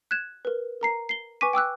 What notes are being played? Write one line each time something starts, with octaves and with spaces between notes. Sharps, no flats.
F#6 G#6 E7
A#4 B4
A#4 A#5 C7
C7 G7
B4 G#5 C#6 D6 B6 D#7
G5 D6 E6 F#6